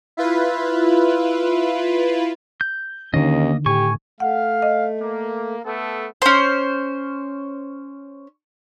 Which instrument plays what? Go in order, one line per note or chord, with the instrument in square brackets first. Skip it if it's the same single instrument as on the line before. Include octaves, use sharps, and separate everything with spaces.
[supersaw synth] E4 F4 B4
[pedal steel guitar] G6
[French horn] D#2 [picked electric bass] D3 D#3 [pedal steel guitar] A#3 D#5 [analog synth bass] C#4
[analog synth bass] A2 [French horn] G4 [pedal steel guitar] G#5 C#6
[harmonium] A3 [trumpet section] F5 [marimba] F#5
[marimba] D#5
[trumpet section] A#3
A3 B3 A4
[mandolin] C#4 C5